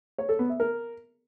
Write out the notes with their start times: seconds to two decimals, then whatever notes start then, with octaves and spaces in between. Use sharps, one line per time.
0.18 C#5
0.29 A4
0.39 B3
0.49 E5
0.60 A#4